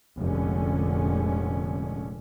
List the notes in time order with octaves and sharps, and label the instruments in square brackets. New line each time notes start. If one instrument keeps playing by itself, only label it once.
[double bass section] F1 A#1 D3 G#3 C#4